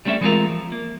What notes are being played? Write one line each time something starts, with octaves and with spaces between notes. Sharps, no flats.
G3 A3 C4 C#4 A4 E5
E3 G#3 A3 C4 F4 A#4
F3
A#3